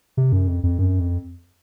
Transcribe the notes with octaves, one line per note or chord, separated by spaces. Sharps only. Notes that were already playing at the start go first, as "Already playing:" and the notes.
C3
F#2
F2
F2
F#2
F2